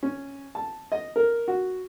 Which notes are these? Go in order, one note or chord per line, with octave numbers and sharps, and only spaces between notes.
C#4
A5
D#5
A#4
F#4